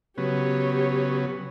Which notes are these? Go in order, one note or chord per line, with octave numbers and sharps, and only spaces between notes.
C#3 F#3 B3 G4 C#5